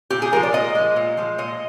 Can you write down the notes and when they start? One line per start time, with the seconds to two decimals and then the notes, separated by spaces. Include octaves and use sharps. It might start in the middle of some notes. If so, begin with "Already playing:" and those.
0.10 A#2 G4
0.22 G#4
0.32 F3 G#3 A#4
0.43 D5
0.53 A#2 D#5
0.75 F3 G#3
0.96 A#2
1.17 F3 G#3
1.38 A#2 D#5